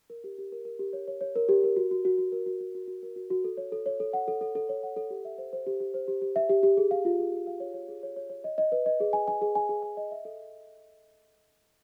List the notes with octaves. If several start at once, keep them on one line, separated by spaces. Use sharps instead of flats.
A#4
G4
G4
A#4
A#4
G4
C#5
C#5
C#5
A#4
G4
A#4
F#4
F#4
F#4
F#4
A#4
F#4
F#4
F#4
F#4
A#4
F#4
F#4
A4
C#5
A4
C#5
A4
F#5
A4
A4
A4
C#5
F#5
A4
G4
E5
C5
C5
G4
G4
C5
G4
G4
E5
G4
G4
G#4
F5
F4
G#4
G#4
F5
C#5
C#5
G#4
C#5
C#5
C#5
D#5
D#5
B4
D#5
G#4
G#5
G#5
G#4
G#5
G#4
G#5
D#5
E5
A4